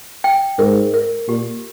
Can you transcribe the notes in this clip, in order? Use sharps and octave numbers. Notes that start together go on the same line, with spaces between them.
G5
G#2 A#4
A#4
A#2 G4